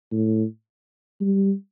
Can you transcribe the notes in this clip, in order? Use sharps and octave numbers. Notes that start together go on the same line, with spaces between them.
A2
G3